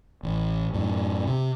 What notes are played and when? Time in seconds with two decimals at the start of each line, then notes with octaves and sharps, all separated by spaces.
0.23 A1
0.73 F#2 A2
1.27 C3